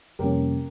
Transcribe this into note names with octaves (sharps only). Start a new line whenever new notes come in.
F2 C3 G3 A#3 C#4 G4 A#4